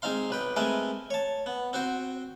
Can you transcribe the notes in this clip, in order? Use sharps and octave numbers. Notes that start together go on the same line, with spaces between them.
G#3 C4 D#4 F5 C6
B1 B4 G5
G#3 A3 C4 A#4 B4 G#5
C#5 A5
B3
C4 F#4 C5 G5